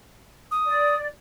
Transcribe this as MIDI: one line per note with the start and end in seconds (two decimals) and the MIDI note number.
0.51 0.96 87
0.65 1.06 74